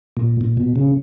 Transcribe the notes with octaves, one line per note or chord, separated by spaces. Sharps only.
A#2
A#2
B2
C#3